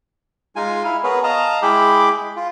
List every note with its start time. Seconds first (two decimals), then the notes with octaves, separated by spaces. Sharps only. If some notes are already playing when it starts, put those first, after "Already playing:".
0.56 G#3 D#4 F4 G#5
0.85 E4 F5
1.04 B3 G#4 A#4 B4 C#5
1.24 D#5 F5 A5 A#5
1.62 G#3 E4 G#4 G5 B5 D6
2.36 F4